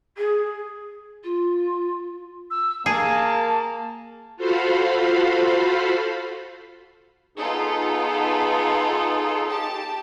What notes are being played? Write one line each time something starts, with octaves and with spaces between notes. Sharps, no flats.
G#4
F4
E6
A#3 G#4 A5
F4 F#4 A4 C5 F5 B5
B3 D#4 F4 G#4 A4
G4 A5